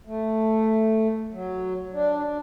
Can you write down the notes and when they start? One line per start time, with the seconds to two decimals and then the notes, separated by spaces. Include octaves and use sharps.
0.07 A3
1.32 F#3
1.93 D4
2.24 D4